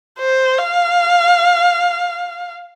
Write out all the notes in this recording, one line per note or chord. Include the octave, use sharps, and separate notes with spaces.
C5
F5